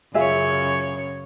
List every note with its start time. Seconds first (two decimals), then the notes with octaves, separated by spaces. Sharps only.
0.14 F#2 C#3 F4 G#4 C#5 E5